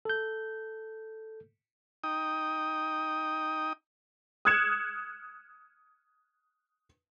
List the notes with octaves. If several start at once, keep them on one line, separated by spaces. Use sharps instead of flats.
A4 G6
D#4 G5 D#6
D#6 F6 F#6 G#6 C#7 E7